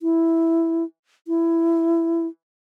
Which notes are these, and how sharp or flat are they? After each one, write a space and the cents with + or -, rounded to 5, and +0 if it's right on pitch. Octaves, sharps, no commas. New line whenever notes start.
E4 +0
E4 +15